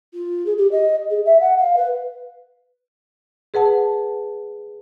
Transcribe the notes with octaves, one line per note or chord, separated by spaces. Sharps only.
F4
G#4
G4
D#5
G#4
E5
F#5
F5
B4
G#4 B4 F#5 A5